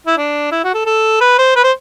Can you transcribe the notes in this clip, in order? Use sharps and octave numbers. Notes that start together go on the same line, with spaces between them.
E4
D4
E4
F#4
A4
A4
B4
C5
B4
C5